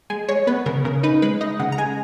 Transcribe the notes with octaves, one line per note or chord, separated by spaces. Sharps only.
G#3 G#5
G#3 C#5
B3 B4
C#3 A#4
C#3 A#4
D#4 B4
G#3 B4
D#4 D#5
C#3 F#5
A#5
G#3 G#5